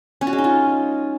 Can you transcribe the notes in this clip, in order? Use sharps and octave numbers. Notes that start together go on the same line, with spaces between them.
C#4
F#4
G#3
D#4
F4